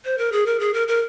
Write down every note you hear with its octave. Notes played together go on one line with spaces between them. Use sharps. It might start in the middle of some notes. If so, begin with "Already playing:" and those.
C5
A#4
G#4
A#4
G#4
A#4
A#4